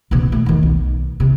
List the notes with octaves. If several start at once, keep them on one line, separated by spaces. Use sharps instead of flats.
A1 B2
A3
E2 D#3
B1
C3